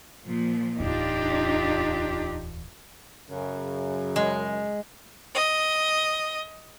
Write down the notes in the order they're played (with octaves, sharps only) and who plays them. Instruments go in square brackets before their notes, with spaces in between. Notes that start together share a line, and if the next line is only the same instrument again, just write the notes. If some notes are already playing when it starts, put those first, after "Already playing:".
[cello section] A#2 F3
[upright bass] D1 E2 [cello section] D4 F4 [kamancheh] D#4 G4
[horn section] F#2 C#3
[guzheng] G#3
[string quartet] D#5